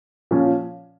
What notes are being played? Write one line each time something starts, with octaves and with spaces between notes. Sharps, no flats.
A#2 F3 C#4